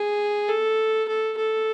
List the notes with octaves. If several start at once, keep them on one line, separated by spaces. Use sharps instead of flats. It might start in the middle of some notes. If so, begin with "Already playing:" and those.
Already playing: G#4
A4
A4
A4